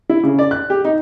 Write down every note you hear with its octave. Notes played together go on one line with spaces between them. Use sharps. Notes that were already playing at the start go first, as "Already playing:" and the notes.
E4
C#3
D5
F#6
G4
D#4